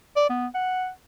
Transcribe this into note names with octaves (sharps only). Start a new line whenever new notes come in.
D5
B3
F#5